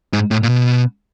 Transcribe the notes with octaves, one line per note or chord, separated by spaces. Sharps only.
G#2
A2
A#2
B2